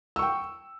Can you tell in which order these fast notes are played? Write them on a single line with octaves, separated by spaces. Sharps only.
E6 C#6 G5